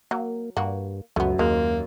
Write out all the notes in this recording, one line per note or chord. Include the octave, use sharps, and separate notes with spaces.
F#3 A#3
G2 A#3 F#4
C#2 F#2 A3 B3
D#2 G#3 A#3